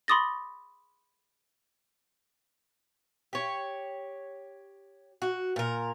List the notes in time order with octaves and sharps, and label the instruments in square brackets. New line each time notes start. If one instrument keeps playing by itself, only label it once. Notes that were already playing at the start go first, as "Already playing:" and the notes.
[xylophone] B5 C6 D6 D#6 A6 A#6
[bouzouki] G4 C#5
F#4
A#2 A#4